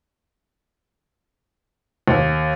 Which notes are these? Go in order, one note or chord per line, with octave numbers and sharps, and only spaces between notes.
D#2